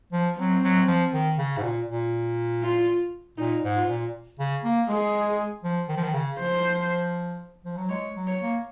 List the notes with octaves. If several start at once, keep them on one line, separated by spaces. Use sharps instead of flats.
F3
F#3 C4
F#3
F3
D#3
C#3
G#2
A#2
A#2
F4
A#2 D#4
G#2
F4
A#2
C#3
A#3
G#3 G#4
F3
D#3
F3
D#3
C#3
F3 C5
F3
F#3
G#3 C#5
F#3
C#5
A#3